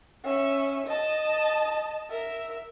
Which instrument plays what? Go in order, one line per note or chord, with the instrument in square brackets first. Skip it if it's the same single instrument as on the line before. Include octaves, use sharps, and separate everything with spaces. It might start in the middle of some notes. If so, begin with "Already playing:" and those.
[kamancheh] C#4 E5
D#5 A5
A#4 E5